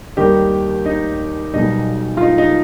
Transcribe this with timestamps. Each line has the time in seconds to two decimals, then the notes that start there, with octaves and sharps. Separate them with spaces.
0.17 D#2 D#3 G3 D#4 G4
0.86 D#4
1.53 B1 B2 G3 D#4
2.17 F4
2.22 D#4
2.38 D#4